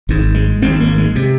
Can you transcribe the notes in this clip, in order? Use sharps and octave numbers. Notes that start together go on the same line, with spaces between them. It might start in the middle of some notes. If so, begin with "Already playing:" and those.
G#1 G#2
G#3
G#1 G#2 C4
A#3
G#3
C3